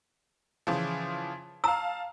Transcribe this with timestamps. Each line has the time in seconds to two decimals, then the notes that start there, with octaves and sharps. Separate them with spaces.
0.67 C#3 E3 F3
1.64 F5 A5 A#5 E6